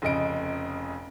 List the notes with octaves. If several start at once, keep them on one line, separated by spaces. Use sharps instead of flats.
F1 C#3 D#5 D7